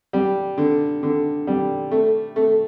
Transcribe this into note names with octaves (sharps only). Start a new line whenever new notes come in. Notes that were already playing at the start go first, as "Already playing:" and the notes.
G3
D3
D3
G3
A3
A3